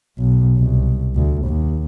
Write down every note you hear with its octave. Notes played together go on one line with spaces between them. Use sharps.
B1
C2
D2
D#2